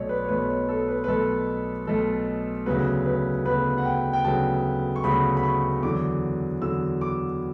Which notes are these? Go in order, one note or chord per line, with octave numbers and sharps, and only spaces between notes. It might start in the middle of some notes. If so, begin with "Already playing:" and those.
Already playing: B1 B2 A3 C#5 D5
B4
C#5
B1 B2 A3 B4
C#5
A4
B4
B4
B1 B2 A3 A4
B1 B2 A3 A4
D2 C#3 F#3 B3 B4
B4
D2 C#3 F#3 B3 B4
F#5
G5
G5
D2 C#3 F#3 B3 A5
C#6
D2 C#3 F#3 B3 B5
B5
C#6
E2 D3 F#3 D6
E2 D3 F#3 E6
D6